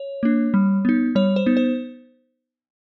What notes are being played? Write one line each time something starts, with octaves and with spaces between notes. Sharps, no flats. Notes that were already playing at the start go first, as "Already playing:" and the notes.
Already playing: C#5
A#3 D4
G3
B3 D#4
G3 C#5
C5
B3 D#4
C5